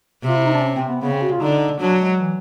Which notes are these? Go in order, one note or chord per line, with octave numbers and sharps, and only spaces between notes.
C3
F4
E4
D#4
D4
C#4
C4
B3
C#3 B3
C4
F#4
F4
D3 D#4
F#3 D4
G#3
E3